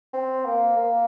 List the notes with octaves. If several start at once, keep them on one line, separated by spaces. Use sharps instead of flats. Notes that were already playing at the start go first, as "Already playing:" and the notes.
C4
A#3
A#3